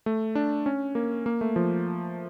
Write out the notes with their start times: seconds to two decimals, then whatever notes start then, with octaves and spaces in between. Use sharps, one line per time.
0.06 A3
0.35 D4
0.66 C#4
0.95 A#3
1.26 A#3
1.41 A3
1.56 F3